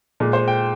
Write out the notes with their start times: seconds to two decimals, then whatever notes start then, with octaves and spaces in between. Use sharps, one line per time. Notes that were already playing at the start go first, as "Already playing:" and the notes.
0.20 A#2 G#3
0.33 C5
0.48 G5